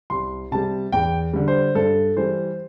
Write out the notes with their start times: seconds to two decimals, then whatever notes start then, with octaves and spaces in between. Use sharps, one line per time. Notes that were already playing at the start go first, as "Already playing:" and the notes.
0.10 C2 C6
0.51 C3 G3 A5
0.92 E2 G5
1.33 D3 G3
1.48 C5
1.75 G2 A4
2.16 E3 G3 C5